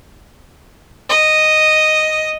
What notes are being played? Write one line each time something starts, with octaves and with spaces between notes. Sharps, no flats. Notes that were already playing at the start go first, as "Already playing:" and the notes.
D#5